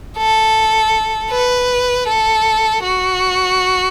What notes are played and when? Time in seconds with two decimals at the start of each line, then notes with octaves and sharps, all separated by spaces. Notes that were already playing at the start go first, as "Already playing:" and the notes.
0.17 A4
1.31 B4
2.08 A4
2.84 F#4